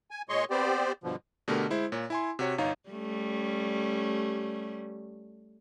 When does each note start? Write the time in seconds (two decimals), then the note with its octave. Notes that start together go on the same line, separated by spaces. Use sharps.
0.11 G#5
0.29 A#2 G#3 C#5 D#5 C6 C#6
0.50 B3 C4 G4 C5 D5
1.04 G2 B2 D3 F3
1.48 B2 D3 A3 G4 A#4
1.70 G#3 E4 C5
1.92 A#2 C#5
2.10 E4 G#5 C6
2.39 C3 F#4 C#5
2.58 G1 D#4 C#5 F5 A#5
2.89 G3 A3 C#4